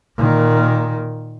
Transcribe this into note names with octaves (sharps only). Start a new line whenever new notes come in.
A#2 D#3